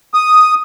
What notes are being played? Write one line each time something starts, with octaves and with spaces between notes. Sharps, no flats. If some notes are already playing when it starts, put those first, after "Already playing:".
D#6